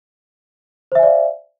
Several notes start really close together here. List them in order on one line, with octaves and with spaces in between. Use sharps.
C5 E5 G#5 D5 F5